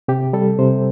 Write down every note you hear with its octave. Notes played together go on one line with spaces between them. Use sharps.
C3 G4
G3 A4
C3 C5